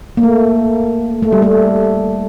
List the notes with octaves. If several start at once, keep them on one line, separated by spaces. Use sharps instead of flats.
A#3
A3
A3
G3
A3